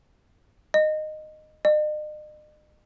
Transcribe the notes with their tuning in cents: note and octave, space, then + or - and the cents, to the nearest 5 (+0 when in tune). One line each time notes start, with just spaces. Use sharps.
D#5 -15
D#5 -45